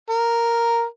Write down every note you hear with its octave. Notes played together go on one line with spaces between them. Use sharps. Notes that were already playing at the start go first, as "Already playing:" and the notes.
A#4